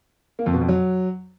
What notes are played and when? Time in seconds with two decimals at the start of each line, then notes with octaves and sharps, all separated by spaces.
0.39 A#3
0.46 F2
0.54 B2
0.61 F2
0.69 F#3